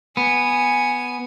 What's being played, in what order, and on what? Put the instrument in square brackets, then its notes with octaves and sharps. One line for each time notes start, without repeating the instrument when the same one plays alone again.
[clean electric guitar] B3 [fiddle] G#5